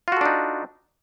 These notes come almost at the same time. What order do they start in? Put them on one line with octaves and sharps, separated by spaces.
F4 F#4 A4 D4 D#4